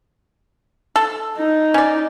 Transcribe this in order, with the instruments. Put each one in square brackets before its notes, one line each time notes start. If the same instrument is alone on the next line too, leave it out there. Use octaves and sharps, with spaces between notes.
[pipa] A4
[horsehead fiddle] D#4
[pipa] C#4 D5